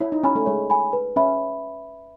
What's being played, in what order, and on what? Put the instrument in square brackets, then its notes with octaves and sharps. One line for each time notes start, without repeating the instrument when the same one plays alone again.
[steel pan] E4 [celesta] C#5
[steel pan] D#4
[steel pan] C#4 [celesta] G#5 B5
[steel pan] A3
[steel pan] G#3 [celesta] C#5
[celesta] G#5 B5
B4
[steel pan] C#4 [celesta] E5 B5